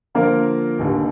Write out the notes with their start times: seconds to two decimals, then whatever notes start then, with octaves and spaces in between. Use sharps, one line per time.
0.15 D3 F3 A#3 F4 A#4
0.79 F1 D#2 D3